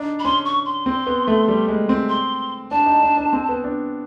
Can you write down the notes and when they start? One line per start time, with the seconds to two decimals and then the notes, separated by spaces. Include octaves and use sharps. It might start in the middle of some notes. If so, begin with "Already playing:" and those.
Already playing: D4 D#4
0.19 B5
0.25 C#4 C6
0.45 C#6
0.66 C6
0.86 C4
1.07 B3
1.27 A3
1.48 G3
1.68 G#3
1.89 C4
2.09 C6
2.71 D4 A5
2.86 D#4
3.02 D4
3.17 D4
3.33 C4
3.49 B3
3.64 D4